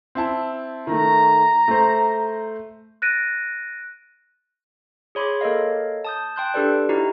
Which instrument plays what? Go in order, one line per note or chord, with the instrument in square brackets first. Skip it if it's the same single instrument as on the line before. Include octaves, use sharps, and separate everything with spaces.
[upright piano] C4 E4 A5
[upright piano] D#3 A3 [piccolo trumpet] A#5
[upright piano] A3 C5
[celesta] F#6 A6 A#6 D7 D#7
[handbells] G#4 C#5 B5 C6 D6
A#3 A4 A#4 C#5 D#5 F5
A5 D#6 G6
G5 A5 C6 F#6 G6
D4 G4 A4 B4 D5
D#4 E4 F#4 G4 A#5